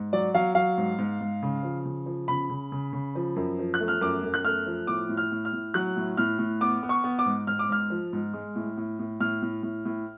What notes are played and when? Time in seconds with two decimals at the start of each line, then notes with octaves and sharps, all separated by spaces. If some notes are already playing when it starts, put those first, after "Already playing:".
Already playing: G#2
0.13 F#3 D5
0.34 F#3 F5
0.55 F#3 F5
0.78 G#2
0.98 G#2
1.20 G#2
1.43 C#3
1.63 F3
1.85 C#3
2.06 F3
2.28 C#3 B5
2.50 C#3
2.72 C#3
2.93 C#3
3.15 F3
3.36 F#2
3.59 F3
3.74 F#6
3.80 A3
3.88 F6
4.01 F#2 D6
4.23 F#2
4.34 F#6
4.45 A3 F6
4.66 F3
4.87 A2 D6
5.09 A2
5.17 F6
5.32 A2
5.45 F6
5.53 A2
5.74 F#3 F#6
5.97 A2
6.17 A2 F6
6.39 A2
6.61 B3 D6
6.83 B3
6.89 C#6
7.04 B3
7.19 D6
7.26 G#2
7.47 G#2 F6
7.59 D6
7.69 G#2 F6
7.90 F3
8.13 G#2
8.33 G#3
8.56 A2
8.77 A2
8.99 A2
9.20 A2 F6
9.42 A2
9.63 A2
9.85 A2